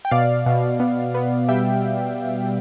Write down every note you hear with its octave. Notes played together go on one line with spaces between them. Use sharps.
G5
B2 D5 F5
B2
B3
B3
G3 E5 G5